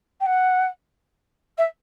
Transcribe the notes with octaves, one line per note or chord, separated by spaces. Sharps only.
G5
F#5
E5